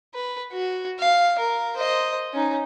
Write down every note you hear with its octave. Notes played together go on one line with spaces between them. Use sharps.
B4
F#4
F5
A#4
C5 D#5
C#4 D#4